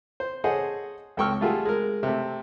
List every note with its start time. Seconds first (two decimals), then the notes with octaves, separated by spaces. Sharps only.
0.20 C5
0.44 G#4 A4 C5 C#5 D#5 F#5
1.17 C#2 A4 G5 C#6 E6 F6
1.41 G3 A3 F4 F#4 G#4 A4
1.66 G#3 A#4
2.03 C3 A3